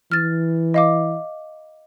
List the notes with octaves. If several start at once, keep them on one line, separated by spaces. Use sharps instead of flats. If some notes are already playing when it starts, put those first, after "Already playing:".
E3 F6 A6
D#5 F5 D6